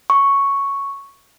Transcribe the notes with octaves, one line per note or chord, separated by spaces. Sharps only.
C#6